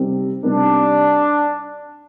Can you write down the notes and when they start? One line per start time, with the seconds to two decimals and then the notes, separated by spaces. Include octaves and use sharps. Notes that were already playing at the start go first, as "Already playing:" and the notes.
Already playing: C3 G3 C4 D#4 A#4
0.43 C3 G3 C4 D4 D#4 A#4